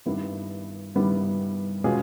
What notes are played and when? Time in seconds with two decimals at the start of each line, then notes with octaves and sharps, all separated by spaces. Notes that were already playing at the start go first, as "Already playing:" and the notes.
0.06 G2 D#3 G3 B3 E4
0.95 G2 D#3 G3 B3 E4
1.84 B2 G#3 C#4 F4 G#4